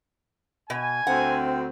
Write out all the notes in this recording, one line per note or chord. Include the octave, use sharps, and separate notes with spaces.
B2 G#5
D2 C4 F#5 G5